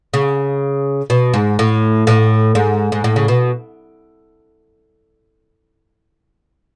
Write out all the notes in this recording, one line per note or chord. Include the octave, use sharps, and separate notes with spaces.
C#3
B2
G#2
A2
A2
G#2
G#2
A2
C#3
B2